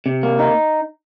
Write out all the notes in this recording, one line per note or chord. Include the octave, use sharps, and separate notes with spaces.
C3
A#3
D#4